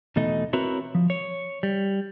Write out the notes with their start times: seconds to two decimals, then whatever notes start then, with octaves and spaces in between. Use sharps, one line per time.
0.16 E2 B2 A3 D#4 D#5
0.53 C4 E4 F#4 A#4 B4 C#5
0.95 F3
1.10 C#5
1.63 G3